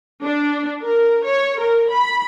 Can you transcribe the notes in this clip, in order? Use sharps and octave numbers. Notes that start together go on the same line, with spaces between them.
D4
A#4
C#5
A#4
B5